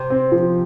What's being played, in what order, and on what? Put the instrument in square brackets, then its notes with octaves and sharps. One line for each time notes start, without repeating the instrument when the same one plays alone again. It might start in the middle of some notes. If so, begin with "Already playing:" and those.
Already playing: [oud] C3
[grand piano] C4
F3